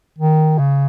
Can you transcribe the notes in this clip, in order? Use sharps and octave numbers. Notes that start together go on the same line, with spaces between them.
D#3
C#3